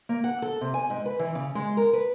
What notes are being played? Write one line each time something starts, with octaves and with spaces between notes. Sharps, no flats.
A#3
F#5
A4
C3
G#5
G#2
B4
E3
C#3
G#3
A#4
B4